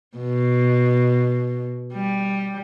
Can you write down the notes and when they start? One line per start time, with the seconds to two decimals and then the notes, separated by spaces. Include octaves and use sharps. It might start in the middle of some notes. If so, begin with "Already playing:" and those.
0.17 B2
1.93 G3